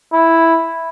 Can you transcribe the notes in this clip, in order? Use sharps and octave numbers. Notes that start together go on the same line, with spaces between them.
E4